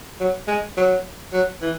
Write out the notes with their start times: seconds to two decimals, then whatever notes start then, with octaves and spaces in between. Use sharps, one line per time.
0.20 F#3
0.48 G#3
0.77 F#3
1.33 F#3
1.62 E3